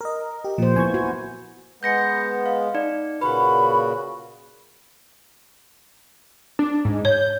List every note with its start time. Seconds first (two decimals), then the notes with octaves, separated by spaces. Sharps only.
0.01 A#4 D#5
0.44 G4
0.58 A#2 F3 A#3 C5
0.76 B3 E4 G#5 C#6 G#6
0.94 F#4
1.83 G#3 B3 G6 A#6 C#7
2.46 F5
2.74 D#4 D5
3.21 A#2 C#3 F#4 B4 B5
6.59 D4
6.85 G#2
7.05 C#5 G6